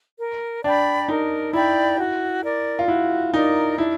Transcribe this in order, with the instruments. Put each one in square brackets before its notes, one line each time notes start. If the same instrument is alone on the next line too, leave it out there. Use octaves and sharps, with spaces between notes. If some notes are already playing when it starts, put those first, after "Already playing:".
[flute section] A#4
[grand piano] D4 [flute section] D5 G5 B5
[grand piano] D#4 [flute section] A#4
[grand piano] E4 [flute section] D5 G5 B5
[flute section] F#4
A#4 D5
[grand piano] F4
[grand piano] E4 [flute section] F#4
[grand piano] D#4 [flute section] A#4 D5
[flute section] D4 [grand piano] E4